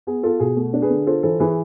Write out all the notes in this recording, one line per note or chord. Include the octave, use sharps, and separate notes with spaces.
B3 G#4
F4 A4
B2 G#4
A3
D4
G#4 B4
D3
F4 A4 C5
E3 A4 C5
E3 G#4 B4